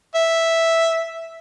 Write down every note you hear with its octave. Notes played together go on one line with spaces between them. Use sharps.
E5